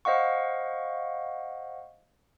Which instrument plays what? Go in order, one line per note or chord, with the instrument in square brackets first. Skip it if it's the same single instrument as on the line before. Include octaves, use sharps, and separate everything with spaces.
[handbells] C5 D#5 F5 F#5 C#6